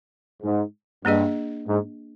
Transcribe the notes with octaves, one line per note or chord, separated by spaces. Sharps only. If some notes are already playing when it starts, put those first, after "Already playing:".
G#2
G2 A#3 D4 G#4 D#5
G#2